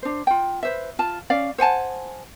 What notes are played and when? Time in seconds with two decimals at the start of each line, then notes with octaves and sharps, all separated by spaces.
0.02 D4 C5
0.27 F4 G5
0.63 B4 C5 E5
0.99 F4 A5
1.30 C#4 D5 F5
1.58 C5 F#5 G#5 A5